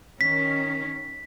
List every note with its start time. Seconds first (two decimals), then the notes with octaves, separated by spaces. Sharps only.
0.21 D#3 C#4 B6